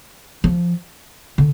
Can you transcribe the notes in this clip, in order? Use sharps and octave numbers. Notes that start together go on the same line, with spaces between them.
F3
D3